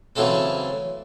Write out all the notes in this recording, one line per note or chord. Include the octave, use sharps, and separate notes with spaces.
C#3 E3 F#3 A3 C4 A4